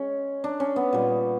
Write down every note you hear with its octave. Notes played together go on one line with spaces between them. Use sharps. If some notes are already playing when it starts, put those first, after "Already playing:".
Already playing: G#3 C#4
D4
C#4
B3
A#2 G3